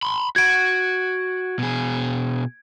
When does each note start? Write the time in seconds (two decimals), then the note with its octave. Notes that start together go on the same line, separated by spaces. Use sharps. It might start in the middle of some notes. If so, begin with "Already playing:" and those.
0.03 B5 C6
0.36 F#4 F#5 G#6 D7
1.59 B2 G#4